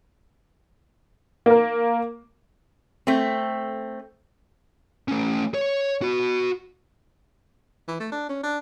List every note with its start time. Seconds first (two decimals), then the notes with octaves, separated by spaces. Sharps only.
1.46 A#3 A#4
3.07 A3 C4
5.08 A3 C#4
5.54 C#5
6.02 F#4 B5
7.88 E3
8.00 A3
8.12 D4
8.29 C#4
8.43 D4